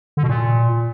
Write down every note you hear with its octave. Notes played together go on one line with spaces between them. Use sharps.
D3
B2
A#2